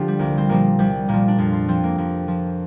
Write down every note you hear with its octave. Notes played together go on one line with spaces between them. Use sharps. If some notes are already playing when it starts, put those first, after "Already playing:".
Already playing: D3 F3 D4 F4 G4
G3
C2 A#3
C4
A#2 F3 A#3
C2 G3
A#2 F3 A#3
D4
F2 F4
F4
F3 C4
A#3
F2 A#3
F3